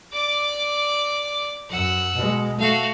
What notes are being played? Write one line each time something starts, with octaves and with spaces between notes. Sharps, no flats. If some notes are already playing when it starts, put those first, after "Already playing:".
D5 D6
F#2 F#5 E6
B2 G#3
A3 F#4 F5